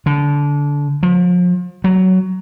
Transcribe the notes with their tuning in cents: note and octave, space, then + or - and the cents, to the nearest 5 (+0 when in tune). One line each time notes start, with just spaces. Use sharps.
D3 -25
F3 +35
F#3 +10